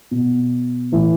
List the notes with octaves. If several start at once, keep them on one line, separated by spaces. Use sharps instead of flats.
B2
A2 E3